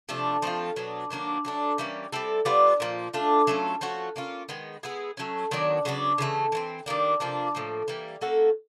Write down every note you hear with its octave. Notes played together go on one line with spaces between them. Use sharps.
C3 F3 A3 D4
F3 A3 C4 F4
B2 F#3 B3 D4
D#3 F#3 A#3 D4
F#3 A3 D4
E3 G3 A#3 C#4
G3 C4 E4 A4
G3 B3 D4 F4
A#2 F3 A#3
A3 D4 F4
F#3 A3 C#4 F4
F3 A3 C#4 F#4
A#3 C#4 F4
D#3 G#3 B3
G#3 B3 E4 G#4
F#3 A3 C#4
D#3 F#3 B3 D4
C#3 F#3 B3 D4
C#3 E3 A3
E3 A3 C4
D#3 G3 A#3 D4
C3 F3 A#3 D4
A2 F3 A#3
E3 G3 A#3
A#3 C#4 F#4 A4